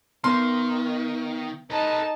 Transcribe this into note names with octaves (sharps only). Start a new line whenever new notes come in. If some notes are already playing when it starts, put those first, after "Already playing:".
D#3 B3 C6 F6
D#4 A4 B4 A5